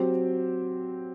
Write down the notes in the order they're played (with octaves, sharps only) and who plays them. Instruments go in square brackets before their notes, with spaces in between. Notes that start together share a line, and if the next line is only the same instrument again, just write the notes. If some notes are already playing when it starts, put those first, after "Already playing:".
Already playing: [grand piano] F#3 C4 G4